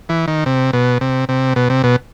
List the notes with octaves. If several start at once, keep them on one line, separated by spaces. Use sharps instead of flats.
E3
D#3
C3
B2
C3
C3
B2
C3
B2